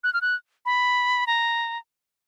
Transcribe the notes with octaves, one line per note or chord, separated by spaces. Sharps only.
F#6
F6
F#6
B5
A#5